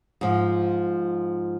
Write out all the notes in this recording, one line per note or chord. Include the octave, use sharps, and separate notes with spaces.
G#2 F3